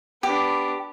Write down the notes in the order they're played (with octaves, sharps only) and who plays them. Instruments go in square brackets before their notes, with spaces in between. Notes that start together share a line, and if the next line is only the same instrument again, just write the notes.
[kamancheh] B3 D4 [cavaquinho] G4